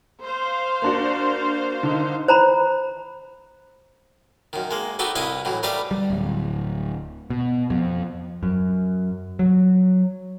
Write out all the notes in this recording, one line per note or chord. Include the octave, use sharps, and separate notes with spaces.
C5 F5
A#3 D4 F#4
D3 D#3 D#4
C5 A#5 B5
F#2 D#3
G#3 A#3
D#4 F#4 G4 A4 B4
C2 E4 B4 D#5 F5 D#6
A2 E3 F#3
G3 A3 A#4 B4 D5 F5
G3
D1
B2
F2
F#2
F#3